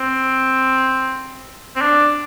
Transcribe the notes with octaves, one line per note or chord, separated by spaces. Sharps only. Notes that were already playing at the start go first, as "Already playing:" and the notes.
Already playing: C4
C4
D4